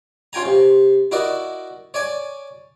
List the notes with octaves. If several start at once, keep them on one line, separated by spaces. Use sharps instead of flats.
C#4 F4 G5 G#5 A#5
C3
E4 F#4 A#4 D5 D#5
C#5 D5 G#5